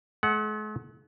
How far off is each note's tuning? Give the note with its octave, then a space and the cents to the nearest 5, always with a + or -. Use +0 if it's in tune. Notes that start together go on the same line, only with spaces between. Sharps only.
G#3 +45 F#5 +0